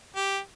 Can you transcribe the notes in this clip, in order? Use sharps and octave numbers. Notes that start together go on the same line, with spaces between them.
G4